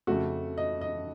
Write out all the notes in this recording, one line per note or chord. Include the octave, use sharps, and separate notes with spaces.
F2 C#3 A3 F#4
D#5
D#5